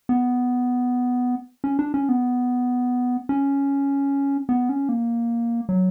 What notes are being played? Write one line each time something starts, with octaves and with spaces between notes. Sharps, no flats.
B3
C#4
D4
C#4
B3
C#4
B3
C#4
A#3
F#3